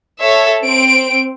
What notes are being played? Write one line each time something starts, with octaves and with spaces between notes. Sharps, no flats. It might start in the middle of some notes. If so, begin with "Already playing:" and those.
A4 C#5 E5
C4 D7